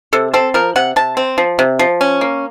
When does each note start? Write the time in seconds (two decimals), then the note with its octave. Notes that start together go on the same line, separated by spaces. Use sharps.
0.13 C3 A4
0.34 C4 A4
0.54 F3 A#4
0.76 C3 F#5
0.96 C3 A5
1.17 C4
1.38 F3
1.59 C3
1.79 F3
2.01 C#4
2.21 A#3